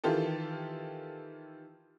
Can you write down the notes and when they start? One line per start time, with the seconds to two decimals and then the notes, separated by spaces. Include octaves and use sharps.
0.04 D#3 E3 F4 G4 A4